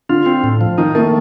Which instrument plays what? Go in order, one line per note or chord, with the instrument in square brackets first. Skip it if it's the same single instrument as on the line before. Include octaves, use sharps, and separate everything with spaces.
[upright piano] D3 [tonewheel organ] F4
[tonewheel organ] C4
A2
F3
[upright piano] D#3 [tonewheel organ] D#4
[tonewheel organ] A3 [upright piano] A#3